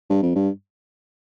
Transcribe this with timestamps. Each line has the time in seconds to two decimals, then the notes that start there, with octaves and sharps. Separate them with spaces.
0.10 G2
0.22 F2
0.35 G2